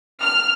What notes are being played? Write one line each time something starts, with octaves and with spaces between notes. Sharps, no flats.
F6